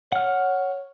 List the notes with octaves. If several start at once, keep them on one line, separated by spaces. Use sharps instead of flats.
C#5 F#5 F6